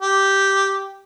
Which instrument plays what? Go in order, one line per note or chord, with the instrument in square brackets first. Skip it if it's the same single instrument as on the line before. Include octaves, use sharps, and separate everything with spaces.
[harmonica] G4